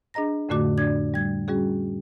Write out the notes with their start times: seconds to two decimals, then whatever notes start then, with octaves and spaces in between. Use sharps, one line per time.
0.14 D4 G#4 D#5 A#5 A#6
0.49 F2 A2 D3 A3 F#4 D6
0.78 D4 D5 G#6
1.14 G3 G#6
1.48 G3 C#4 F#4 G#4